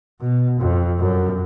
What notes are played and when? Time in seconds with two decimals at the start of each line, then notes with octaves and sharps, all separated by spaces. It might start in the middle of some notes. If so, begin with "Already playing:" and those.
0.21 B2
0.60 F2
1.00 F#2